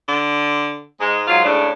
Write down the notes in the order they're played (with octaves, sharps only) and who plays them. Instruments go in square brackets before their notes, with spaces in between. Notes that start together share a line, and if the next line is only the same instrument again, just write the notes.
[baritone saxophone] D3
[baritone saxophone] G#2 [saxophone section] G#3
[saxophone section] F#3 F4
A2 C#3 D4